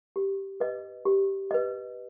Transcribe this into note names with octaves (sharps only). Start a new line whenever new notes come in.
G4
B4 D#5
G4
B4 D#5